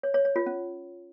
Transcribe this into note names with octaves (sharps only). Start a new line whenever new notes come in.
C#5
C#5
C#5
F4
C#4